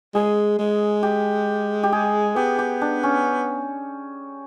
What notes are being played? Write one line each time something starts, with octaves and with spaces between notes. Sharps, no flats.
G#3 G#4
G#3
G4
G4
G#4
B3 G4
G4
D4
C#4